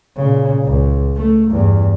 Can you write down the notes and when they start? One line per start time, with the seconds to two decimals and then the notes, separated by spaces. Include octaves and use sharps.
0.16 A#2 C#3
0.65 C#2
1.16 A3
1.51 E2 G2